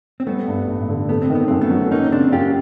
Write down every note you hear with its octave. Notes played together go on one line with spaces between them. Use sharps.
C4
G3 A3 B3
G2
A1
D3
A3 B3
C4
D#3
B3
F#2 C4
A3 B3
F#3
A#3 C#4 D#4
C#3 C4 D4
F#2 F4 G4